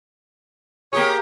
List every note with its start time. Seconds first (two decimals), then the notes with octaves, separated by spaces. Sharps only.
0.93 A#3 G4 G#4 C#5